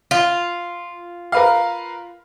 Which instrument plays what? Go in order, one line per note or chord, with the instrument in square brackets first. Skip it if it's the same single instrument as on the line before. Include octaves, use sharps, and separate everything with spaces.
[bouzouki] F4
[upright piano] A#4 B4 F5